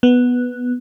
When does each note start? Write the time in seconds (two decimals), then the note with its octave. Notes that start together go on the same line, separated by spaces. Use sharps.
0.03 B3